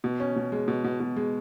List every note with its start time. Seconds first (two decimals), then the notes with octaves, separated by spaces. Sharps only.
0.04 B2
0.20 C#4
0.36 B2
0.52 G#3
0.68 B2
0.84 B2
1.00 B2
1.16 G#3